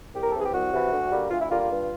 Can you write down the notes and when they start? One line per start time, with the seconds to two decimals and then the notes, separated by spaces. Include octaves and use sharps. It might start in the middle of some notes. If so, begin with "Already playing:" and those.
0.14 C2 G4
0.23 A#4
0.30 A4
0.34 C3 E3 G#4
0.45 G4
0.53 C2 F#4
0.72 C3 E3
0.91 D2
1.11 D3 G3 A#3
1.30 D2 F4
1.41 E4
1.49 D3 G3 A#3 F4
1.60 F4
1.70 G2